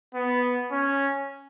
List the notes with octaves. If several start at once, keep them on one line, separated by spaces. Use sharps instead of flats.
B3
C#4